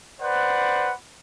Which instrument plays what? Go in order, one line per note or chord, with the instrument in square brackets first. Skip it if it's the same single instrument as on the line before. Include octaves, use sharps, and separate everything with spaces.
[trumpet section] B4 C5 D5 F#5